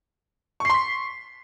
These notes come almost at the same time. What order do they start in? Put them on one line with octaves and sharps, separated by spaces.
C#6 C7 C6 B6